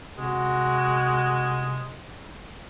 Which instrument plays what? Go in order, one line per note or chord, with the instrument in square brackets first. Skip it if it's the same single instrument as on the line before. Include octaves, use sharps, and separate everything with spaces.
[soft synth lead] C3 [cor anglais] G#3 [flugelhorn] F#4